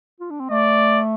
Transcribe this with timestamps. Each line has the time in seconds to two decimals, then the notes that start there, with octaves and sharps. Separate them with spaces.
0.20 F4
0.30 D4
0.40 C4
0.50 A3 D5